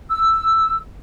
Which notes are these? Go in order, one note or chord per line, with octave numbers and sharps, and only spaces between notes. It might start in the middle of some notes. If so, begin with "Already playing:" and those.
E6